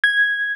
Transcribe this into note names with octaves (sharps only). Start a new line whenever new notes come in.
G#6